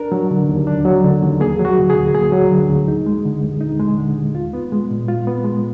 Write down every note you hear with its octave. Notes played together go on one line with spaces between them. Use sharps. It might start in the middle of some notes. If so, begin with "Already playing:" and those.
Already playing: D4 A#4
F#3
D3
D#2
D4
F#3
D3
D#2
A#3 G#4
F#3
F#4
D3
G#4
D2
A#3 G#4
F#3
D3
D2
D#4
G#3
D3
D#2
D#4
G#3
D3
D#2
F4
B3
G#3
A#2
F4
B3
G#3